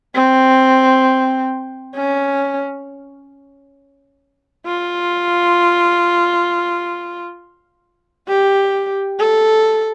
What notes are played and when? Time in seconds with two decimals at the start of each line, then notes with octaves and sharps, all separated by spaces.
0.15 C4
1.95 C#4
4.67 F4
8.28 G4
9.19 A4